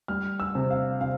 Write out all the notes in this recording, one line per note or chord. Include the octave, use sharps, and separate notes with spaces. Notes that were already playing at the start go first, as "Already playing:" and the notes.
G3 F6
E6
C3
F5
C3 F5